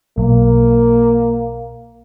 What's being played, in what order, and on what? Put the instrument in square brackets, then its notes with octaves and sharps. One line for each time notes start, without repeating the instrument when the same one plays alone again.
[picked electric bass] B1 [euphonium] A#3